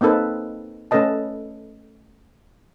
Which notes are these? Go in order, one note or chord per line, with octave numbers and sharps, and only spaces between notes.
A#3 C4 D#4 A4 B4
A3 C#4 A4 B4 D#5 A5